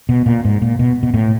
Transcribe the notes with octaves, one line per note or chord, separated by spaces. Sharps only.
B2
A#2
G#2
A#2
B2
B2
A2